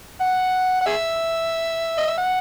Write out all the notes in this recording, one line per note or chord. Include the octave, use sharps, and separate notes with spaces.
F#5
F#5
G#4 E5
D#5
E5
F#5